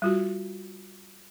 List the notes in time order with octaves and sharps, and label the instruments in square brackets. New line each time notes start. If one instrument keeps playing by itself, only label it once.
[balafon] G3 F4 F#4